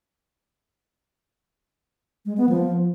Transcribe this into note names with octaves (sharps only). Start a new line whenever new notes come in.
G#3
B3
F3